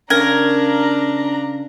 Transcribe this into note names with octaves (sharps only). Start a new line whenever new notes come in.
C#3 D4 A#4 A#5 G#6